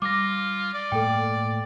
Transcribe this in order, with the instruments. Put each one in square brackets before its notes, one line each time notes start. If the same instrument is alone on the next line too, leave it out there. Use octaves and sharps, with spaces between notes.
[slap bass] G3 [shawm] F4 [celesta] D6 A#6
[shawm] D5
[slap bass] A2 A3 A#3 [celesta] A4 G5